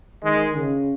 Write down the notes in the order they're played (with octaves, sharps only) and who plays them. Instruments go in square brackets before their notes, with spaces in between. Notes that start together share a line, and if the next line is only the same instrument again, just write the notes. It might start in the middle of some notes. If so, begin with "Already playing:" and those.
[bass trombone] D#3 [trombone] G#3
[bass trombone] C#3